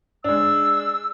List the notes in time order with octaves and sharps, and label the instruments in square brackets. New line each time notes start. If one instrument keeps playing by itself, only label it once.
[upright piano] G#3 D4 [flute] E6